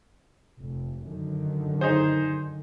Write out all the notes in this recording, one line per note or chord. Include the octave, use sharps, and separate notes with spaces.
F1
F#2 D3 D#3
D#4 G#4 C5